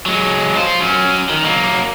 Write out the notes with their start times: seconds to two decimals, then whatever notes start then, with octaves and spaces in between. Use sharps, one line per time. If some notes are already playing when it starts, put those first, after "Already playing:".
0.06 F#3 G#3
0.56 F4 C5
0.79 F#3 C#4
1.30 D#3
1.45 F#3 A#3